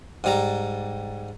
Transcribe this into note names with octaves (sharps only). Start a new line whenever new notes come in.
G#2 G3 A#5